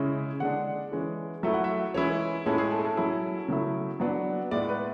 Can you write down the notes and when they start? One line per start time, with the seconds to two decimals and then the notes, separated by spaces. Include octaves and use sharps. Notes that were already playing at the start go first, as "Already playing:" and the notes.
Already playing: C#3 G#3 C#4 E4
0.40 D3 G#3 D4 F#5
0.92 E3 G#3 C#4
1.43 F#3 A3 E4 E5
1.54 F#5
1.64 E5
1.94 E3 G#3 C#4 E4 C#5
2.46 A2 G#3 C#4 E4 A4
2.58 G#4
2.71 A4
2.84 A4
2.97 F#3 C#4 E4
3.48 C#3 F#3 A3 E4
4.00 F#3 B3 D4
4.51 A2 G#3 B3 D5
4.69 B4